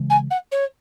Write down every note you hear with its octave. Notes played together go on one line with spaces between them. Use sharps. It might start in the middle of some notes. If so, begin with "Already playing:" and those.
Already playing: C#3 E3 G#3
G#5
F#5
C#5